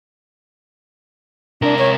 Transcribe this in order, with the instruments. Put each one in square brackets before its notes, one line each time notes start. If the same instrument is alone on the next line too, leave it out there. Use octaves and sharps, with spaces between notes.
[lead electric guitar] C3 A#4 [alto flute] D4
[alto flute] C#5